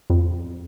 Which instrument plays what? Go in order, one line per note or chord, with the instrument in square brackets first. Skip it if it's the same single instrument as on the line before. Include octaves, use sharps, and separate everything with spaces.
[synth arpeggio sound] F2